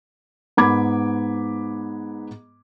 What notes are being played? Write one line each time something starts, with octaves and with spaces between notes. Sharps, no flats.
G#2 B3 B5 D6 G#6